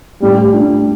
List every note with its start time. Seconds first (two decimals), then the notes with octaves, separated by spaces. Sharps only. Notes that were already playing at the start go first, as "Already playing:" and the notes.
0.22 A2 G3
0.52 A3 D4 F4